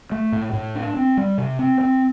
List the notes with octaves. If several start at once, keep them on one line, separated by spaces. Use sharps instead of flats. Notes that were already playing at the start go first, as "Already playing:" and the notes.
A3
A2
A2
D4
C4
G3
C3
C4
C4